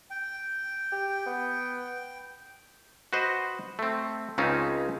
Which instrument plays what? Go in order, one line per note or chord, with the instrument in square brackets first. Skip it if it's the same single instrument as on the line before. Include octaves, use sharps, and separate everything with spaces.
[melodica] G5
[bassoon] G4
B3
[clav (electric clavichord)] F#4 B4 C5 D#5
A3 C4
C#2 C#3 C4 C#4 D#4 A5